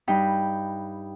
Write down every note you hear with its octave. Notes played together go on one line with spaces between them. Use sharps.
G2 D#4 G5 B5